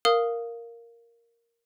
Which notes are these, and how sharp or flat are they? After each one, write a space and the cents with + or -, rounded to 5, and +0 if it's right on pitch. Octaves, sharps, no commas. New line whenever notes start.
A#4 +0 F5 +0 D#6 +0